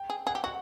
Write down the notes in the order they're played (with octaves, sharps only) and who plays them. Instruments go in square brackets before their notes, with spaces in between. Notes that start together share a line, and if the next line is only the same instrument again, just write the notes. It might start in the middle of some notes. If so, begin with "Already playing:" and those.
Already playing: [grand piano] G5
[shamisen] G#4
[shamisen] G#4 [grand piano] F#5
[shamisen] G4
[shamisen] F#4 [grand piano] F#5